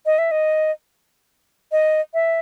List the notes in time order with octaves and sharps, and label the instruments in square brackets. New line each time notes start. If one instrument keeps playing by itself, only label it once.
[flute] D#5
E5
D#5
D#5
E5